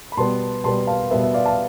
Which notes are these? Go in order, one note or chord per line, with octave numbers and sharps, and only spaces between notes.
B5
B2 G3 B3 A5 C6
B2 G3 B3 A5 C6
F5 A5
B2 G3 B3 E5
E5
D5 F5
F5 A5